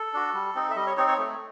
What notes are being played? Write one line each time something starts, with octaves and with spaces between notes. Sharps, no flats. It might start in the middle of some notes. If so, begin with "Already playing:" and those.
Already playing: A4
D4 F#4
G3
C4 D#4
E5
G3 D#5
C#5
C4 D#4 C#5
C#5
A3